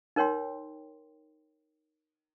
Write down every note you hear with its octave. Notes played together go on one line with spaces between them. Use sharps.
D#4 A#4 C#5 G5 C6